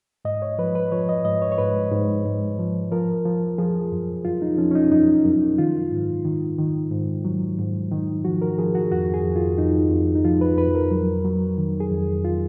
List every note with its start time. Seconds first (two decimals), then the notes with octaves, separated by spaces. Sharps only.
0.25 G#2 D#5
0.42 C#5
0.58 F3 B4
0.75 B4
0.92 F3 C#5
1.09 D#5
1.25 G#2 D#5
1.42 C#5
1.52 C#5
1.58 G#2 B4
1.92 G#2
2.25 G#2
2.59 F3
2.91 F3 A#4
3.25 F3
3.58 F3 G#4
3.92 F#2
4.25 F#2 F4
4.42 D#4
4.58 F3 C#4
4.71 C#4
4.75 D#4
4.91 F#2 D#4
5.25 F#2
5.58 D#3 F4
5.92 G#2
6.25 D#3
6.58 D#3
6.91 G#2
7.25 F#3
7.58 G#2
7.91 D#3
8.25 F3 F#4
8.42 A#4
8.58 F3 G#4
8.75 F#4
8.91 F2 F#4
9.14 G#4
9.25 F2
9.36 F4
9.58 F2 D#4
9.91 F2
10.15 D#4
10.25 F3 F4
10.41 B4
10.58 F2 B4
10.75 A#4
10.91 F#3
11.25 F#3
11.58 D#3
11.80 G#4
11.91 F2
12.25 F4